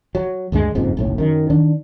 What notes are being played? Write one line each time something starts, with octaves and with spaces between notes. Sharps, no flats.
F#3
D2 G2 F#3 G#3
F#1 F2 G#2
F#1 B1 A2
F#2 D#3
D#3 D4